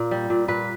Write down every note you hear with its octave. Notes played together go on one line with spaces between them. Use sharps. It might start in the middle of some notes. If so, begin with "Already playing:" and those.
Already playing: A#2
G3
A#2
A#2 B4